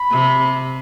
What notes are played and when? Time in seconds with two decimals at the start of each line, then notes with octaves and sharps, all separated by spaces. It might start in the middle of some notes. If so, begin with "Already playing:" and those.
Already playing: B5
0.10 C3